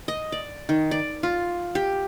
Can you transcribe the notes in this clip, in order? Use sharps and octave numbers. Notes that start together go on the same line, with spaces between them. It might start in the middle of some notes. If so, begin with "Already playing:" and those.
D#5
D5
D#3
D5
F4
G4